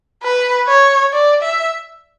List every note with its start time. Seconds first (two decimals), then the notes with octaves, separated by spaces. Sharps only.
0.22 B4
0.67 C#5
1.13 D5
1.42 E5